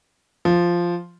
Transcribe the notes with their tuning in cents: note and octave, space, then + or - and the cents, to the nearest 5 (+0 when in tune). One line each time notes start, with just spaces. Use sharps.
F3 -5